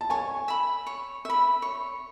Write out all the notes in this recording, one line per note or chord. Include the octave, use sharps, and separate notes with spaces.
A5
C#5 G#5
E5 B5
C#5
E5 B5
C#5